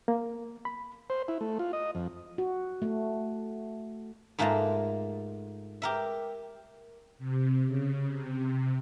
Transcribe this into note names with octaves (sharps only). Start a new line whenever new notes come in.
A#3
B5
C5
E4
A3
F4
D#5
F2
F#4
A3
G#2 A3 A#3 F4 A5 A#5
G4 A#4 E5
C3
C#3
C3